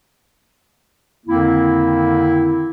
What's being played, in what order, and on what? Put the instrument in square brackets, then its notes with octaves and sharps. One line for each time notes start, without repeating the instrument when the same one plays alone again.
[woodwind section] F2 D3 D#3 A#3 C4 E4